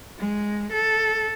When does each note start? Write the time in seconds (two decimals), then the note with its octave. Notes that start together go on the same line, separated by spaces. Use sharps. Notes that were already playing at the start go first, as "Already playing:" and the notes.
0.19 G#3
0.73 A4